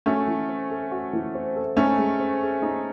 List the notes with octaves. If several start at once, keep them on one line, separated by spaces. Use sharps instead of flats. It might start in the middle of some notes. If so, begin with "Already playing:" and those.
A3 C#4 F#4
E3
C4
A4
F#4
E3
C4
A4
A3 C#4 D#4
G#3
C4
G#4
D#4